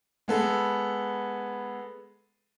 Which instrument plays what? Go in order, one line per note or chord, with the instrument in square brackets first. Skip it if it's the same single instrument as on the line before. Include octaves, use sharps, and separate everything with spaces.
[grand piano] G#3 B3 A4